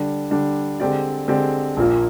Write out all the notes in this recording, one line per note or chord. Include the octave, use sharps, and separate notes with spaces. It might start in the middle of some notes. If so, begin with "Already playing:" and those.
Already playing: D3 G3 D4
D3 G3 D4
D3 G#3 C4 G4 D5
D3 G#3 C4 G4 D5
A#1 A#2 F3 A#3 F4